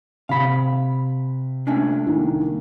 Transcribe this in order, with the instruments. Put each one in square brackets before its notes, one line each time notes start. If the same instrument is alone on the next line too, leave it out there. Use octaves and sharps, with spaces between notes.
[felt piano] C3 [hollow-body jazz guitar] F5 B5
[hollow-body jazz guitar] A3 C#4 D4
[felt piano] C2 D#3 A#3